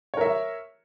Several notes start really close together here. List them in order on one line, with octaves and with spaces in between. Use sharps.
C#5 A#4 E5